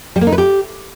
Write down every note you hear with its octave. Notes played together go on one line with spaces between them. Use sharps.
G3
A#3
D#4
B4
G4